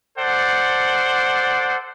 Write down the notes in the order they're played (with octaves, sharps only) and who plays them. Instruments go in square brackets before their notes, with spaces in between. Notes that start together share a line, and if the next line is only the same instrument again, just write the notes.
[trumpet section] A4 C5 D5 F#5